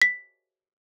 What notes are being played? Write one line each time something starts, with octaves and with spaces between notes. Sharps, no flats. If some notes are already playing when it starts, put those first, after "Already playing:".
B6